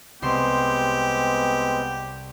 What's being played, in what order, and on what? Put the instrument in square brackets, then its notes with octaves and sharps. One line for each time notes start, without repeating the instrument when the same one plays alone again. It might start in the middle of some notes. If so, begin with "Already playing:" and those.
[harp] C2 C6 E7 [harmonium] G#3 B3 C4 [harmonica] G4